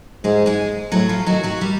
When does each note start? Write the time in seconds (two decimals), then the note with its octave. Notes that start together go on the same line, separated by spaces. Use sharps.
0.24 G#2 G#3 G#4
0.46 G#3 G#4
0.92 A2 F#3 F#4
1.09 F3 F4
1.26 D#3 F#3 F#4
1.43 F#3 F#4
1.61 G3 G4